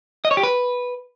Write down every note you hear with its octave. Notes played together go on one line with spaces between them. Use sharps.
D#5
C#5
G4
B4